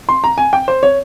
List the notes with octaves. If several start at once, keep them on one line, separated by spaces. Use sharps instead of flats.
C6
A#5
G#5
G5
C5
C#5